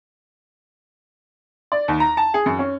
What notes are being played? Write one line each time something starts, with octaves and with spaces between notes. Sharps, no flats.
D5
D#2
A#5
A5
G#4
F#2
C#4